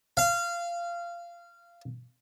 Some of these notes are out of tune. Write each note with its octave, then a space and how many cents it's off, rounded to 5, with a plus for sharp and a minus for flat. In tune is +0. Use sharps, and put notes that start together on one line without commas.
F5 -20